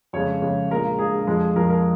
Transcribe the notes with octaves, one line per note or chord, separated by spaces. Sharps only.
F2 C#3 G#3 C#5
F2 C#3 G#3
A#1 A#2 G#3 A#4
A#1 A#2 G#3 G#4
F2 F3 G#3
F2 F3 G#3 A#4
A#4